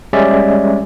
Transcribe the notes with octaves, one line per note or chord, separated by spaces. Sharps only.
G3 G#3 C#4 D5 E5